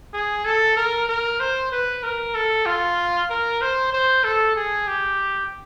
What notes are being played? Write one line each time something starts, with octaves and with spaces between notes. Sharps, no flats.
G#4
A4
A#4
A#4
C5
B4
A#4
A4
F4
A#4
C5
C5
A4
G#4
G4